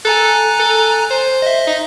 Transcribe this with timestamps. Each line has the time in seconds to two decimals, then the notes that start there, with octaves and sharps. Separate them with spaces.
0.05 A4 G#5 A#5 F#6
0.59 A4
1.10 C5
1.42 D#5 E5
1.67 D#4